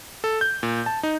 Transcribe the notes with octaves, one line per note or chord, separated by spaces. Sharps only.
A4
G6
A#2
A5
D#4